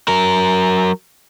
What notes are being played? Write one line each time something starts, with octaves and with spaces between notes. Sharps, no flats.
F#3 A#4